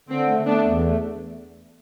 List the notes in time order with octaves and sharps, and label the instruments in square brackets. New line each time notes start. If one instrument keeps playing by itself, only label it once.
[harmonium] D3 [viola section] C4
[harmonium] A3
[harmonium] A3 [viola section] B3 D4
[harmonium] E2
A3